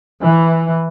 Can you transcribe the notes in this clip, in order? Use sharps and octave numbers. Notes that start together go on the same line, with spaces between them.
E3